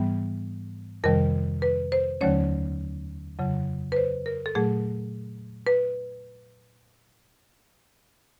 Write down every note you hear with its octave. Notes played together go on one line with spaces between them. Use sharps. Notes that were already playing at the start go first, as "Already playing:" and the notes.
Already playing: G#2 E3 G3 B3
F2 C3 D#3 G3 A#4
B4
C5
D#2 D3 F#3 A3 C#4 C#5
F2 C#3 F#3
B4
C5
A#4
A4
A#2 F#3 A3 G#4
B4